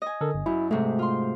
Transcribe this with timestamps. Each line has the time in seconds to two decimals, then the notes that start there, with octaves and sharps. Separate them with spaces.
0.02 D#5 G#5
0.21 D3 A4 A#4
0.34 G1
0.46 F#2 E4
0.71 G#2 C3 A3
0.99 F4 C6